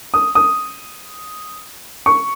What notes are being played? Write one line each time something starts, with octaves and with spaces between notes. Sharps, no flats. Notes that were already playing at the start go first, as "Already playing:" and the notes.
D#6
D#6
C#6